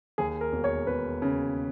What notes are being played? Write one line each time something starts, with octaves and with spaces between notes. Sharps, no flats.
D#2 G#4
A#4
E1
C#5
E1 B4
C#3